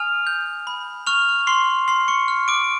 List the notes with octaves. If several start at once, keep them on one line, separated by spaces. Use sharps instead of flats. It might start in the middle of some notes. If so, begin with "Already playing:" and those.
Already playing: G#5 D#6 F6 F7
G6
B5
C#6 F6 F7
C6 C#6 C7
C6 F6 C7
C#6 C#7
F6
D6 D7